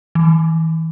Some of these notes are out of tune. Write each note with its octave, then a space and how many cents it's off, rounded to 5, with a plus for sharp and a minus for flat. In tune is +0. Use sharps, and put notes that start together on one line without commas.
E3 -35